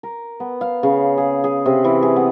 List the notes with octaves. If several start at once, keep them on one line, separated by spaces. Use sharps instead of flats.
A#4
B3
F5
C#3
G#4
G#4
C3
E3
G#4
B3